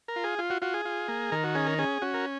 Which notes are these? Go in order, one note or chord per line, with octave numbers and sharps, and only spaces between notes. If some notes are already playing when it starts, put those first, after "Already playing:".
A#4
F4
G#4
F4
F#4
F4 F#4
G#4
F4
A#3
D#3 A#4
F#4
C#4 G#4
A#4
C#4 G#4
C#4 F#4
A#4